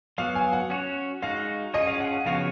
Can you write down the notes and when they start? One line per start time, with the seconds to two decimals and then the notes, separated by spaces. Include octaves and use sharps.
0.18 F#3 B3 F#4 F5
0.35 G#5
0.53 F#5
0.70 C#4 F#4 C#5
1.22 G#3 D#4 F#4 F5
1.74 C#4 F4 G#4 C#5 D#5
1.87 F5
2.00 F#5
2.13 F#5
2.26 C#3 F3 B3 F#4 C#5 F5